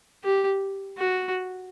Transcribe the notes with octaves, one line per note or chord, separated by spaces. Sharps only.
G4
F#4